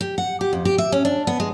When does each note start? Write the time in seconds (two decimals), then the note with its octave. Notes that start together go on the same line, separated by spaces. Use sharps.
0.01 G4
0.18 F#5
0.41 G4
0.53 F2
0.65 G4
0.78 E5
0.92 C#4
1.05 D4
1.27 B3
1.40 G#3